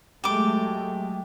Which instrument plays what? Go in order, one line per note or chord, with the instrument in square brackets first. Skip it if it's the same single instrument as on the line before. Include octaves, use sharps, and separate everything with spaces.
[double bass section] F#3 G#3 A3 [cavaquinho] G4 D6